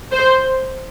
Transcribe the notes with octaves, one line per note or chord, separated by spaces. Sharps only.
C5